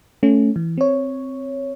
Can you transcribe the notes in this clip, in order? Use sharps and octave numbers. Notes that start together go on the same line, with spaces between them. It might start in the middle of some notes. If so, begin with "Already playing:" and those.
A3 C#4
E3
C4 C#5